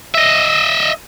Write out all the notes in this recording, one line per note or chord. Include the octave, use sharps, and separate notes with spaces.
D#5 E5